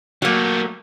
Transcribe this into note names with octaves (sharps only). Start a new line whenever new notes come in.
F#3 G3 A3 A#3